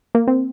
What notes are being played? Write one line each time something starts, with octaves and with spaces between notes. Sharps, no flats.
A#3
C4